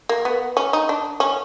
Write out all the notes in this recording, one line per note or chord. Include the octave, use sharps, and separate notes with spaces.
A#3
B3
C#4
D#4
D4
C#4